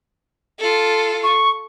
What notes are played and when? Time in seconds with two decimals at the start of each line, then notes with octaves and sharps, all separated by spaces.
0.59 F4 A4
1.23 C#6